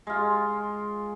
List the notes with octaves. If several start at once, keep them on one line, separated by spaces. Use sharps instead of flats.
G#3 F4